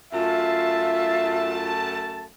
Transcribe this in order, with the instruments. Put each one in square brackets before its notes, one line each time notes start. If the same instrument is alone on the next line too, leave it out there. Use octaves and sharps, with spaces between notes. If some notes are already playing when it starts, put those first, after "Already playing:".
[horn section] F#2 A3 A5 [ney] F4 [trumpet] E5